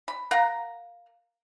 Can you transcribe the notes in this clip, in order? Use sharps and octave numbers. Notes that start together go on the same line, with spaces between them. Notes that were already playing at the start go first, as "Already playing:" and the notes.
B5
A#4 F5 F#5 A#5